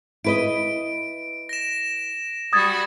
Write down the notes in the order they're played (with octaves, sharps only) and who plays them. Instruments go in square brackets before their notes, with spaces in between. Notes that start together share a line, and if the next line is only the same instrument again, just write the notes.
[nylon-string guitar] E4 B4 D#5 [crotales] D7
[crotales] A#6 E7
[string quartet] G3 F#4 B5 [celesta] D#6 G#6 A6